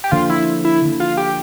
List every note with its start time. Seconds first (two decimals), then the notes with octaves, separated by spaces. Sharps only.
0.04 G4
0.11 D3 F3 A#3 D4 F4
0.30 E4
0.65 E4
0.83 D3 F3 A#3 D4
1.00 F4
1.17 G4